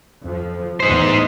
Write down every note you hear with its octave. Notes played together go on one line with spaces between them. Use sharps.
F2 F3
E2 A2 E3 D#4 C5